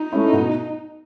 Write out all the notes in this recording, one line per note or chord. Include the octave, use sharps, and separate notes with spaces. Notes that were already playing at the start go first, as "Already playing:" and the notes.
Already playing: D#4
A3 C#4 E4
B2